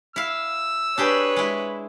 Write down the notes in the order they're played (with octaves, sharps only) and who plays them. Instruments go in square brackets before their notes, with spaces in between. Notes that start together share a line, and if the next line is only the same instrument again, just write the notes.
[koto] E4 F5 [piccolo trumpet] E6
[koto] D4 G4 G#4 [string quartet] B4 C#5
[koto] G#3 E4